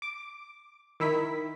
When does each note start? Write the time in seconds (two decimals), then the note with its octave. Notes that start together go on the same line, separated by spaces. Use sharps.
0.02 D6
1.00 D#3 E4 B6